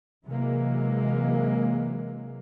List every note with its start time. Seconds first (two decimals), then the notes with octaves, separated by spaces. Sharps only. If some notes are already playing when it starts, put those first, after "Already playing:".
0.24 C3 E3 F#3 G#3 A#3